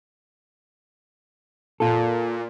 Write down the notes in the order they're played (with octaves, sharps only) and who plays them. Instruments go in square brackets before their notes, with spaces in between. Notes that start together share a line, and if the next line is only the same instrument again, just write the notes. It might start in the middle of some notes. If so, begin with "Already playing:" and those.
[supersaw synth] A#2 [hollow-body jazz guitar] F4 A4